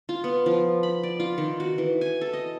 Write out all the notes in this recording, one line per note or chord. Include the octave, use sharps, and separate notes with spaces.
F4
B3
F3
B5
D5
F4
D#3
F#4
E3
G#5
A4
D#5